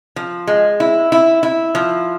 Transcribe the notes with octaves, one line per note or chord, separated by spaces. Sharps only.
F3
G#3
E4
E4
E4
F3